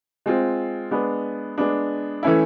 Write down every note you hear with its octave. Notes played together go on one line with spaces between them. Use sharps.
G#3 C4 F4
G#3 B3 D4
G#3 B3 D4
E3 A3 C#4 E4